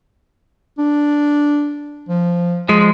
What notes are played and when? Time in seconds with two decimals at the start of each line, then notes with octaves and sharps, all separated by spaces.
0.78 D4
2.09 F3
2.69 F3 G#3